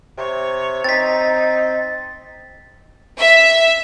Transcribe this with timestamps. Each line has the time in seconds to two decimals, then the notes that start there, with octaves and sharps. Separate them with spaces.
0.17 C3 C#5
0.84 C4 D#4 A6 B6
3.20 E5